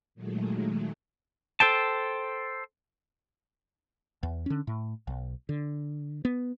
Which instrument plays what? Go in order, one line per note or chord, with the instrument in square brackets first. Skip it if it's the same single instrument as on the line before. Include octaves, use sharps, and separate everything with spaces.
[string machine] A#2 D#3 F#3 G#3 A3
[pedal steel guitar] A4 C5 G5 A5
[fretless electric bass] E2
D3 C#4
A2
B1
D3
B3